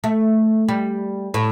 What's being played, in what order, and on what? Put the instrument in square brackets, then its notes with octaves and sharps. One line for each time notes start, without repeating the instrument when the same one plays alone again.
[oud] A3
G3
A2